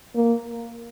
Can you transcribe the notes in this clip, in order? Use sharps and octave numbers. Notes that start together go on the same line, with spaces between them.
A#3